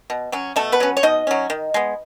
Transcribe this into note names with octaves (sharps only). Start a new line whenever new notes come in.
B2
F#3 C#4
B2 A3 A4
B3 B4
F#3 C#4
C#5
B2 D#4 D#5
F#3 C#4
D#3
G#3 B3